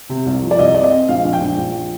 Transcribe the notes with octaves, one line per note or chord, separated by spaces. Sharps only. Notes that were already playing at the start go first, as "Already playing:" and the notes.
C3
C2
F3
D5
C2 D#5
C4 D5
D#5
C4
A#1 F5
A#1
G5
A#1
A#1
F3